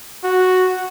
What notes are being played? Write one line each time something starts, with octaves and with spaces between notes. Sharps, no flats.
F#4